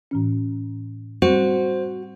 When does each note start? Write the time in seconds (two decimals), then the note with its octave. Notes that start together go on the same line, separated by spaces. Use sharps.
0.11 A2 E3 C#4
1.22 G3 C4 F#4 C5